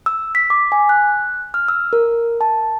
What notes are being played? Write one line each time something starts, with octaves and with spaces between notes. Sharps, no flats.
E6
B6
D6
G#5
F#6
F6
E6
A#4
A5